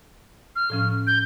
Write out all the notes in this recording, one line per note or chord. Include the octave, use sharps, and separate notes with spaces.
F6
A2 F3 C#4
G6